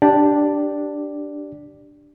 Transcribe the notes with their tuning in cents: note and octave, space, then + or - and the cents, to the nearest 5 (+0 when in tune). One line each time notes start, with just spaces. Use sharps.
D4 +0 G4 +0 D5 +0